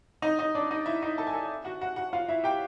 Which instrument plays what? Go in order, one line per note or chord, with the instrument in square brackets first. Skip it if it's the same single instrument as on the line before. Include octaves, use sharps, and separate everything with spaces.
[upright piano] D#4 D#5
D#4 D#5
D4 D5
D#4 D#5
E4 E5
D#4 D#5
A4 A5
G#5
A4 A5
F#4 F#5
F#4 F#5
F#4 F#5
F4 F5
E4 E5
G4 G5